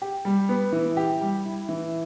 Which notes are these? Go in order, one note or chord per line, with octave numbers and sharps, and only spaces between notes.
G4
G3
B3
E3
G4
G3
E4
E3